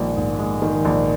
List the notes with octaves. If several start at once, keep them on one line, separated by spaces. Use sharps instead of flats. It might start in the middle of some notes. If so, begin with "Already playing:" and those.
Already playing: A#1 D#3 G#3
G#2
G#3
D#3
A#1